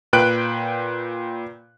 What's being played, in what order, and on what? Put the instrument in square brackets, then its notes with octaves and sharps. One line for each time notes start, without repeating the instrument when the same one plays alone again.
[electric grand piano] A#2 B4 G5 F#6 D7